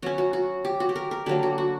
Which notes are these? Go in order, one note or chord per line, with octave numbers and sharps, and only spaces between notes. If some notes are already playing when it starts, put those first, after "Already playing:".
F#3 C#4 F#4
F#4
F#4
G4
F#4
G4
A#4
A#4
D3 F#3 A#3 G4
F#4
F#4